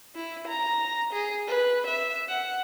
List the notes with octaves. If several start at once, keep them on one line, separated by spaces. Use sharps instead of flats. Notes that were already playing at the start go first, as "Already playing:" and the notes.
E4
A#5
G#4
B4
E5
F#5